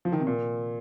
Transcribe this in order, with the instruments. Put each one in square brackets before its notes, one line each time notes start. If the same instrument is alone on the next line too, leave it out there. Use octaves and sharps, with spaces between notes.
[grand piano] F3
D#3
C3
A#2